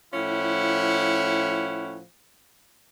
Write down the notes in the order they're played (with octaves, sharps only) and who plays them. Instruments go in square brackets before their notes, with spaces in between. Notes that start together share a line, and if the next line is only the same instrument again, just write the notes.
[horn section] A2 F3 C#4 E4 F#5